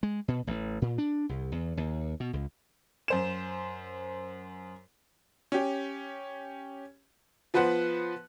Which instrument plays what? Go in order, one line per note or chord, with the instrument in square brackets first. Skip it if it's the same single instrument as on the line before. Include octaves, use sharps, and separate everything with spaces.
[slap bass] G#3
B2
A1
A#2
D4
C2
E2
D#2
B2
C#2
[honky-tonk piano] F#2 C5 E7
C#4 G4
F3 B3 B4 C5 F#5 F#6